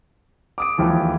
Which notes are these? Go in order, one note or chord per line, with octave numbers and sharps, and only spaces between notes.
D6 D#6 D7
D#2 E3 F3 G#3